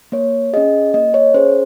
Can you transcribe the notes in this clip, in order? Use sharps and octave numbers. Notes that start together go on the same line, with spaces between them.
A#3 C#5
C#4 G#4 D#5
A#3 D#5
C#5
C#4 G#4 C5